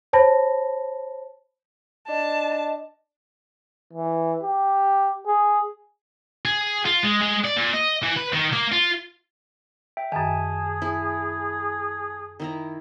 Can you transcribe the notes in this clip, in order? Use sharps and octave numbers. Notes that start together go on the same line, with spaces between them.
C5 C#5 A5 B5 A#6
D4 D#5 A5
E3
G4
G#4
G#4
F4
G#3
G#3
D5
A#2
D#5
E3
B4
D#3
A#3
F4
E5 G5
F#2 D#3 G#4 G#5 A5
E4
D#3 E4 A#5